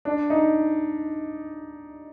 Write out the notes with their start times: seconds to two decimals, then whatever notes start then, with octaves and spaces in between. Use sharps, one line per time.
0.05 D4
0.30 D#4